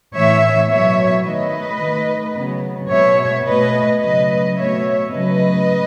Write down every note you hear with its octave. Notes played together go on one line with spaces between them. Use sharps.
A2 E3 A3 C#5 E5
B2 F#3 B3 C#5 E5
D#3 A3 B4 D#5
D#3 A3
C#3 F#3 B3
B2 G#3 B3 C#5 E5
B2 A3 B4 D#5
C#3 F#3 A3 B4 D#5
B2 A3 C#5 E5
C#3 F#3 A3 B4 D#5